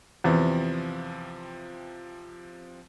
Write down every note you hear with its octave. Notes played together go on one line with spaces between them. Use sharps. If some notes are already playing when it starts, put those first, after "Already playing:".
E2 C3 F3 C4